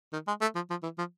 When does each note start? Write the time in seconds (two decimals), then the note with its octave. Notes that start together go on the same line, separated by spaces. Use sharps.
0.13 D#3
0.28 G#3
0.41 A3
0.55 F3
0.70 F3
0.83 E3
0.98 F3